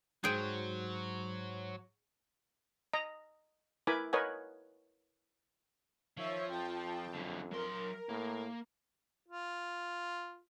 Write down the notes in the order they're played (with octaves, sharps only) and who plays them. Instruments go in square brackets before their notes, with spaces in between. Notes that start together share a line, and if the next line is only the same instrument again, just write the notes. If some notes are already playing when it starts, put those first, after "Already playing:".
[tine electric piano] G#2 C5 [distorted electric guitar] F#3 [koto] G#4 G5
[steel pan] D#5 A#5
E4 A#4 B4 G#5 B5 D6
A#4 B4 C#5 D#5 F#5 G#5
[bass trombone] D#3 [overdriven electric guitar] F3 [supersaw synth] C#5 E5
[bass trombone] F2 [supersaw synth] G5 A5
[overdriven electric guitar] F#2 D3
[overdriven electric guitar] F#3 C6 [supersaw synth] A#4
[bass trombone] A2 [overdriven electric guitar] A#3
[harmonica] F4